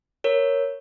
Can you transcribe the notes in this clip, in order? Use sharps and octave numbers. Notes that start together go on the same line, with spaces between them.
A#4 C#5